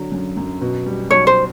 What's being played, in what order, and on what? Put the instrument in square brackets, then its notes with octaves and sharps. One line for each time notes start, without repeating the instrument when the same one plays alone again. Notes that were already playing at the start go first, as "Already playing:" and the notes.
Already playing: [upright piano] D3 F#3
F#2
F#2
B2
G3
[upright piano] B1 [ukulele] C#5
[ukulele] C5